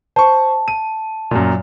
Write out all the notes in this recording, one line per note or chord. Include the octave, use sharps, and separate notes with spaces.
C5 A5 C#6
D#7
F#2 A#2